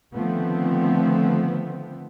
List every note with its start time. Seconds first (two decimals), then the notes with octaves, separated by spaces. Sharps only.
0.15 D3 D#3 F3 A3 B3 C4